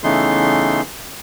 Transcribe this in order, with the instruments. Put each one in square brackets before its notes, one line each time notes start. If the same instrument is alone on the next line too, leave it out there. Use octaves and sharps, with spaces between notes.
[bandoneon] C#3 E3 A3 B3 D#4 C6